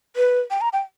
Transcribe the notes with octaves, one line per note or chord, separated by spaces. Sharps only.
B4
G5
A#5
G5